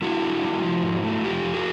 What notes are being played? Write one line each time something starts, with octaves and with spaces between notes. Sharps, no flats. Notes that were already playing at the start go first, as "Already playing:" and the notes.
G3 E4 F#4
D3
G3
F3
G#2
A3
F2 F4 G4
F2
F#4 G#4